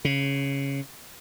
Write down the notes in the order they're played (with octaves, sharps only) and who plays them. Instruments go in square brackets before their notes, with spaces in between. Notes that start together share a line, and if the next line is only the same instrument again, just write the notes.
[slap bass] C#3